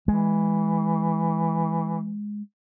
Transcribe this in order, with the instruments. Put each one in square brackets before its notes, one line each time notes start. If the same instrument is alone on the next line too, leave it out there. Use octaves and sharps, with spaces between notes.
[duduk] E3 [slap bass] G#3